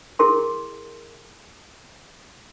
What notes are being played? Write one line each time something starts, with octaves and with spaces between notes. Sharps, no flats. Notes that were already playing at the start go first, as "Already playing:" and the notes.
E4 G#4 A#4 C6